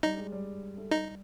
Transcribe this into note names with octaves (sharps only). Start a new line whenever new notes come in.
G3 D#4
G#3
G3
A3
G3 D#4